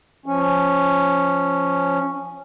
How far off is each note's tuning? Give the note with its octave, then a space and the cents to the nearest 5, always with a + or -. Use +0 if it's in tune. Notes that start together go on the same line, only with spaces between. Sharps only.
F3 +0 C#4 +0